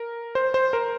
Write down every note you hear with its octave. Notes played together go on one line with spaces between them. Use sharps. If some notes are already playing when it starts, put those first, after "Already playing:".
Already playing: A#4
C5
C5
A#4